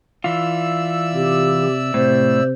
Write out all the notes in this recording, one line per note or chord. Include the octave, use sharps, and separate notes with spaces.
E3 F4 D5 E5 E6
C3 G4
A2 C3 C5